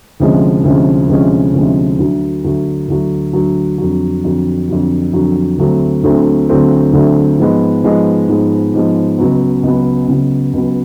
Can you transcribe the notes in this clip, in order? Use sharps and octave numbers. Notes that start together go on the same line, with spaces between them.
D2 C3 F3 G#3 C#4
D2 C3 F3 G#3 C#4
D2 C3 F3 G#3 C#4
D2 C3 F3 G#3 C#4
D2 D3 F#3
D2 D3 F#3
D2 D3 F#3
D2 D3 F#3
F2 D3 F#3
F2 D3 F#3
F2 D3 F#3
F2 D3 F#3
D2 D3 F#3 A3 C4
D2 D3 F#3 A3 C4
D2 D3 F#3 A3 C4
D2 D3 F#3 A3 C4
G#2 F3 G#3 B3
G#2 F3 G#3 B3
G#2 F3 G#3 B3
G#2 F3 G#3 B3
C#2 C#3 F#3 B3
C#2 C#3 F#3 B3
C#2 C#3 F#3 B3
C#2 C#3 F#3 B3